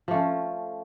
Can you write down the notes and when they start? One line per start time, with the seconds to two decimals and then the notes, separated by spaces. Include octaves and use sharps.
0.08 F3
0.11 A3
0.13 C#4